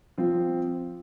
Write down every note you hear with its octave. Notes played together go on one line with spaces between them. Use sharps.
F3 C4 F4